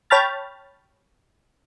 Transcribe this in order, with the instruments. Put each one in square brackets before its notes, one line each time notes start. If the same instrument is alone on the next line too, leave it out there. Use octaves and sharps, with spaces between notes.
[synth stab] C#5 G5 A5 B5 F6 A6